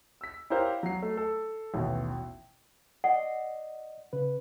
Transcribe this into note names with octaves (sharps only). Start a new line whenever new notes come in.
E6 B6
E4 G4 A#4 C5 C#5 F5
F#3 C7
A3
A4
A1 D#2 B2
D5 D#5 F#5
C#3 B4